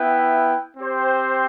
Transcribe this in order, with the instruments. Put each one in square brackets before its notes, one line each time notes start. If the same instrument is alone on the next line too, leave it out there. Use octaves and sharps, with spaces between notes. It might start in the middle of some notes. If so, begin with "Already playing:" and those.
Already playing: [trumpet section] B3 E4 B4 E5 G5
C4 G4 C5